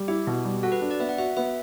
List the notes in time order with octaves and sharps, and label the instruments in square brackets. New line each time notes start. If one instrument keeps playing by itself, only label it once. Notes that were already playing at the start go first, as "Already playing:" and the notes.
Already playing: [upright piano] G3
[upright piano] E4 [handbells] G4
[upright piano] B2
G3
[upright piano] F#4 [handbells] A4
[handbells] B4
[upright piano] D4
[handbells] D5
[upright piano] B3 [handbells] E5
[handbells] F#5
[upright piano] F#4 [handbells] E5
[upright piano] B3 [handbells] E5